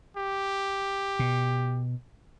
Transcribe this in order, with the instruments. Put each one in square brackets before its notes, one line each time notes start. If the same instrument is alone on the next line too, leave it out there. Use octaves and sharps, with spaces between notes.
[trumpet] G4
[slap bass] B2